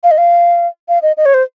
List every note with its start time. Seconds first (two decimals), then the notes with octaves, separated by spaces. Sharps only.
0.04 F5
0.11 D#5
0.18 F5
0.89 F5
1.02 D#5
1.17 D#5
1.26 C#5
1.34 C5